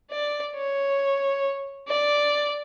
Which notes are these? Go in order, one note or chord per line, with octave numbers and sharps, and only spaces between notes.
D5
C#5
D5